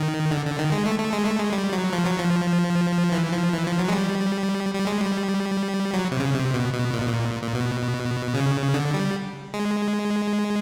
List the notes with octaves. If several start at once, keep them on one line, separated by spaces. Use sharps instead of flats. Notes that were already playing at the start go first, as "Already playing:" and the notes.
Already playing: D#3
D3
D3
D#3
G#3
A3
A3
G#3
A3
G#3
G3
F#3
F3
F#3
F3
E3
F3
E3
F3
F#3
G#3
G3
G3
G#3
G3
F#3
C3
C#3
C3
B2
B2
A#2
B2
A#2
A#2
B2
C#3
D3
G3
G#3